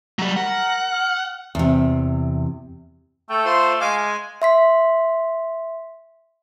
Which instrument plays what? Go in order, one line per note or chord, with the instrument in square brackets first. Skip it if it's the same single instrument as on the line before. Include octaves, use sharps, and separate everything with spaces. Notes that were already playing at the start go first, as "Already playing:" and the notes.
[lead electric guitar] F#3 G3
[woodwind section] A#4 A#5 [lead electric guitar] F#5
[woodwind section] F6
[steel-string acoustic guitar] E2 C3
[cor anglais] A3 [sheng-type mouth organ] A4 G5
[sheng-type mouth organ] F4 C5 C6
[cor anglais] G#3 [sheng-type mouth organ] F5 G#5 D6
[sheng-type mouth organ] G#5
[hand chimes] E5 C6 B6